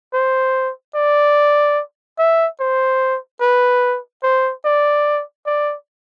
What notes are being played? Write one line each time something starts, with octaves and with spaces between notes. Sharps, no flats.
C5
D5
E5
C5
B4
C5
D5
D5